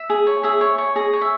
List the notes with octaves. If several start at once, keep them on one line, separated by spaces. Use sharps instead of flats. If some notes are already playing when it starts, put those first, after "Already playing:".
Already playing: E5
G#4
C#5
G#4 E5
C#5
C#5
G#4 D#5
C#5
E5